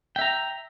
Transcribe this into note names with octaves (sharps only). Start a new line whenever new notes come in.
E5 G5 A#5